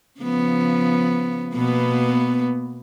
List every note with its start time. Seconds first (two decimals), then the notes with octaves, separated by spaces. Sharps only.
0.20 C#3 F3 B3
1.54 B2 A#3 B3